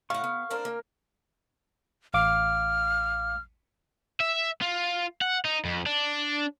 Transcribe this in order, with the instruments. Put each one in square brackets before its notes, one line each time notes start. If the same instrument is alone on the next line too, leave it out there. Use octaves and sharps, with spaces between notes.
[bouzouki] A2 F#5 [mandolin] F5 [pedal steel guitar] C#6
[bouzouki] B3
[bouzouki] A#3 D4 C5 [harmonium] A#4
[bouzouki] A#3
[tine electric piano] A1 F5 D6 [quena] F6
[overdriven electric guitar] E5
F4
F#5
D#4
F2
D4